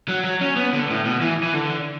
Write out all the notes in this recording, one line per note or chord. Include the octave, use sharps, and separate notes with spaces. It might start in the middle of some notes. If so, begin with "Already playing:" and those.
F#3
F#3
C#4
B3
D3
A2
B2
E3
E3
D3